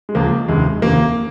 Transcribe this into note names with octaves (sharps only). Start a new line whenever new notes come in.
G#3
C#2 C#3 F3 A#3
F1 D#2 C#3 G#3
F1 D#2 C#3 A#3